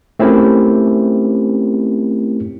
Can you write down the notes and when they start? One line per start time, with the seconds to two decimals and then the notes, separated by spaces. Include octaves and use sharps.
0.19 A3 C4 C#4 E4 G4 A#4